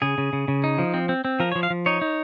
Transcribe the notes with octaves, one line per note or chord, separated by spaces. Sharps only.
C#3 G#4
C#3
C#3
C#3
D#4
F3
C4
C4
C4
F3 A#4
C#5
F3
F5
F3
D#4 C#5
D#4